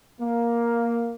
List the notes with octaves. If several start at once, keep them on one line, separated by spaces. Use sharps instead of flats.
A#3